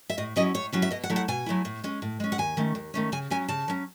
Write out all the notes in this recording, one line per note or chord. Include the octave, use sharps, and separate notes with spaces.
E5
A2 D#5
F#3 C#4 E4 D#5
A2 C#5
F#3 C#4 E4
E5
B2 D#5
F#5
F#3 A3 E4
F#5
B2 G#5
F#3 A3 E4
A2
G#3 C#4
A2
G#3 C#4
F#5
D#2 G#5
D#3 A3 C#4
D#2
D#3 A3 C#4
C#3 G#5
F#3 C#4 G#5
C#3 A5
F#3 C#4